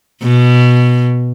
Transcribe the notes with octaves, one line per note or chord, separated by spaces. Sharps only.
B2